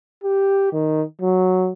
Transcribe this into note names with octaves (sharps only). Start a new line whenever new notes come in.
G4
D#3
F#3